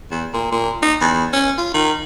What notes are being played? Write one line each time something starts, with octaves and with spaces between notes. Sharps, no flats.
E2
A#2
A#2
D#4
E2
C#4
F4
D#3